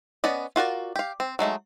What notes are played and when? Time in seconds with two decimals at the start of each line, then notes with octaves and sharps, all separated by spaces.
0.24 B3 C#4 D5 D#5
0.56 F4 F#4 A#4 D5
0.96 G4 F5
1.20 C4
1.39 F#3 G#3 A3 D#4